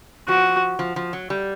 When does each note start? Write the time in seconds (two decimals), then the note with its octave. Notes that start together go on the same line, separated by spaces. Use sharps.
0.28 F3 F#4
0.79 F3
0.96 F3
1.13 F#3
1.30 G3